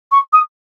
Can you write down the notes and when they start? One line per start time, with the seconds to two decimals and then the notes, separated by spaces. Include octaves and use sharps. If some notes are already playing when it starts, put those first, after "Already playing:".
0.11 C#6
0.32 D#6